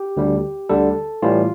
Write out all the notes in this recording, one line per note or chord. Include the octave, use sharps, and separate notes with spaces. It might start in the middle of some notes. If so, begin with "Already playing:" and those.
Already playing: G4
D2 D3 G3
D2 D3 G3 A4
A2 E3 G3 F4